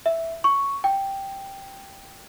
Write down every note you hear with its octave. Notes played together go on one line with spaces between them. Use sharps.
E5
C#6
G5